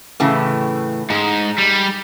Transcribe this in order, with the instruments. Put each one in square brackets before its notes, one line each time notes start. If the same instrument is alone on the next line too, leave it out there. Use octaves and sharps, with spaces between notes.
[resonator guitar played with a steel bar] A2 C#3 E3
[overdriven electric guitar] G#2 [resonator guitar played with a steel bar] G#3
[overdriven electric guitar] G3